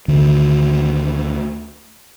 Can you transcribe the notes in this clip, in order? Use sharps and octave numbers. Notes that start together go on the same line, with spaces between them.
D2 D3 D#3